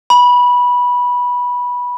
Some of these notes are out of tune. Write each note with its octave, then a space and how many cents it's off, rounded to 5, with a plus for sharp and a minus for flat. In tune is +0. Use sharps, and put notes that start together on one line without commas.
B5 -15